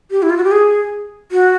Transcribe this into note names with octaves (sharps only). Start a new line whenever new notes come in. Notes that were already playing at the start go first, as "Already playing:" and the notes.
G4
E4
F4
F#4
G4
G#4
F#4